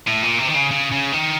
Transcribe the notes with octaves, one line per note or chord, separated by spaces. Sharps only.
A2
A#2
C3
D#3
C#3
C#3
C#3
D#3